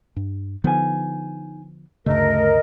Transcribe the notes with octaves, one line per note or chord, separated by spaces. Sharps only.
G2
D3 F3 B3 D#4 G#5
D2 G2 C#3 A3 A#4 D#5